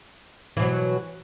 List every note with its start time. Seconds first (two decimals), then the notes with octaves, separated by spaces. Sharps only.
0.57 E3
0.59 B2
0.62 F#3